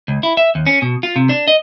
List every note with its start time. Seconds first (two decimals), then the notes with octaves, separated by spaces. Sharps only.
0.08 C#2
0.23 E4
0.37 E5
0.55 D#2
0.66 C#4
0.82 B2
1.03 F4
1.16 C3
1.29 D4
1.48 D#5